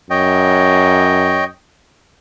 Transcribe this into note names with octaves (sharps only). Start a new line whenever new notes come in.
F#2 C#5 D#5 G5